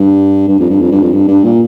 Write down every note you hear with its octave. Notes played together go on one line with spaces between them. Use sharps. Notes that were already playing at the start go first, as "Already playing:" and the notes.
Already playing: G2
G2
F2
G2
F2
G2
F2
G2
G2
A#2